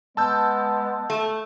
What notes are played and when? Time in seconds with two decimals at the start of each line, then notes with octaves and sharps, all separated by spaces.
0.17 G#3 B3 A5 E6 G6
1.10 A3